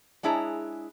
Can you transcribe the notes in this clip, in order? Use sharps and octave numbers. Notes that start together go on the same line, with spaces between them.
G#3 D4 E4 G#4 C#5 A#5